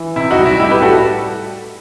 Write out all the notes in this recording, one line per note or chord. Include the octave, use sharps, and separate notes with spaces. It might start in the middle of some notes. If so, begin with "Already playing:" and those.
Already playing: E3
C3 E4
D#4 F#4
G3
E4
A2 E4 G4
G4 B4
G3 F#4 A4